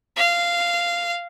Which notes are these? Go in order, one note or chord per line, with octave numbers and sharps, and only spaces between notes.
F5